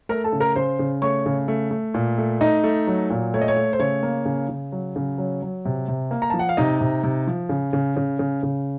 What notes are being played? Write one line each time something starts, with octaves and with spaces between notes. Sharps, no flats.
A3 A#4 A#5
A4 A5
C#3
A#4 A#5
C#3 C5 C6
C#3
A3 C#5 C#6
C#3
A3
A3
A#2
A3
A3 D#4 D#5
A3
F#3
A#2
A3 C#5
D#5
C#5
A3
C5
C#3 C#5
A#3
C#3
C#3
F#3
C#3
F#3
F#3
C3
C3
A#3
A#5
F3 A5
F#5
F5
C3 D#4 D#5
C3
C3
F3
C#3
C#3
C#3
C#3
C#3